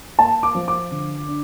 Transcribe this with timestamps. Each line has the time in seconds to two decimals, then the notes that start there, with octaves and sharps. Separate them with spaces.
0.19 A#3 A5
0.43 D6
0.55 F3
0.68 D6
0.91 D3
1.28 D4